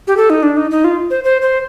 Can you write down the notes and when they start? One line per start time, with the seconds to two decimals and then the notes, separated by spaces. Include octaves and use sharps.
0.07 G4
0.17 A4
0.30 D#4
0.43 D4
0.57 D#4
0.71 D#4
0.84 F4
1.10 C5
1.24 C5
1.42 C5